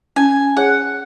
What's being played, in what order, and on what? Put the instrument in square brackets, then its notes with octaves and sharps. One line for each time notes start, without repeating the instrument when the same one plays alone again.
[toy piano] C#4 [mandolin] G#5
[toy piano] G#4 C#5 [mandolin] F#5